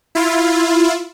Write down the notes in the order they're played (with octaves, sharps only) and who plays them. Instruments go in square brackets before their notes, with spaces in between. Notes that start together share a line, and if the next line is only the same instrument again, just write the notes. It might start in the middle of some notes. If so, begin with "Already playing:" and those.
[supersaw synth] E4 F4